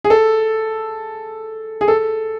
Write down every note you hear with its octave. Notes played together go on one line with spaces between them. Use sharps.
G#4
A4
G#4
A4